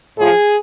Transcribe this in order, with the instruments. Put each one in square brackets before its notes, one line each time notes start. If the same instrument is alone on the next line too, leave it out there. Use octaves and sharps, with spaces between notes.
[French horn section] A2 F3 G#4